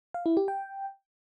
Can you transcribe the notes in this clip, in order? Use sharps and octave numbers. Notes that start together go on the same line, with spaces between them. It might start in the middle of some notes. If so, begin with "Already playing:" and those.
F5
E4
G4
G5